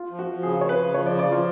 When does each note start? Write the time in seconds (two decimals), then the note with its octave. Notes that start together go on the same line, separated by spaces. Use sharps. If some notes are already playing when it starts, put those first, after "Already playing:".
Already playing: F4
0.11 F3
0.19 F#4
0.27 F3
0.43 C#3 G#4
0.60 F3 C#5
0.69 B4
0.77 C#3
0.94 F3 C#5
1.06 D5
1.11 C#3
1.19 D5
1.28 F3 F4